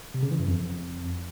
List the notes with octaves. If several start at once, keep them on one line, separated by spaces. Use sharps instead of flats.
C3
C#3
E3
F#2
F2